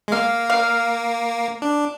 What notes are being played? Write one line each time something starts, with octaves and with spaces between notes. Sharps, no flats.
G#3
A#3 F5
F5
D4